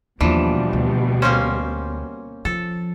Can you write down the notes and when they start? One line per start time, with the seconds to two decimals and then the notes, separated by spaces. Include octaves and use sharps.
0.21 D#2 B2 E3 F3 G3 D4
0.73 D2
1.22 A#3 C4 C#4 C5
2.45 F3 A4